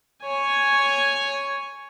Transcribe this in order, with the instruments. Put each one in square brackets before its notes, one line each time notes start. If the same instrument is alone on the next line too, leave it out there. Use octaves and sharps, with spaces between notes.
[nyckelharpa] C#5 G#5